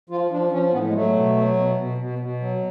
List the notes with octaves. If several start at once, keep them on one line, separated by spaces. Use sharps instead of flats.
F3 F4
F3 D4
F3 C#4
A2 B3
G#3
F#3 A3
B2
F#3
B2
B2
B2
B2
F#3